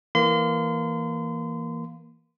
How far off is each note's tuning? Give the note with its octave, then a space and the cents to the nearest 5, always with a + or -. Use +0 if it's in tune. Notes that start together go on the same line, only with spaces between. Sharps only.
E3 +0 A#3 +0 C6 -35